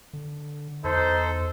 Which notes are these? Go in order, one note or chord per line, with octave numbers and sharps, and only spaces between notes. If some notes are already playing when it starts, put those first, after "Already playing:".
D3
E2 D#4 A4 C5